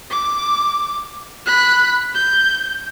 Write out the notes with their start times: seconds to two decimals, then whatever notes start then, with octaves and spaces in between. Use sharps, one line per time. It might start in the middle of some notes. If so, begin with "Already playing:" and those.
0.11 D6
1.46 B5 F#6
2.15 G6